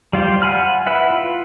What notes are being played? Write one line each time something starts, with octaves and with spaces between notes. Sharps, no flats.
G3 F4 G4 C5
F#5 G#5 B5 F6
E4 B4 E5 F#5
F4